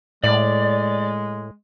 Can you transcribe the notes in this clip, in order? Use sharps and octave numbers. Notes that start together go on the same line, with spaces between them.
A2 G#3 D5